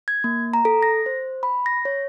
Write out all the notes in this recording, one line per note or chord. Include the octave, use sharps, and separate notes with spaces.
G#6
A#3
A#5
A4
A#6
C5
B5
A#6
C#5